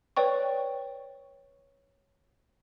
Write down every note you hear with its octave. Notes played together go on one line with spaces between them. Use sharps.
B4 C#5 D5 G5 C#6